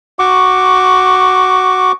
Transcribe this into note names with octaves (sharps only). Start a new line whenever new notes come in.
F#4 C#6 D6